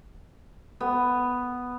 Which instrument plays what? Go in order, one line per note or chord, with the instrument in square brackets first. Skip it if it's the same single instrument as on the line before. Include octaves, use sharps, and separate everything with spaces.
[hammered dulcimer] B3